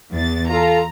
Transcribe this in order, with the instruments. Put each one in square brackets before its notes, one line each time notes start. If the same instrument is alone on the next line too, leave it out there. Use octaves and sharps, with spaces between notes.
[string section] E2 A6
[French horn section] F4 A4 [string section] A#5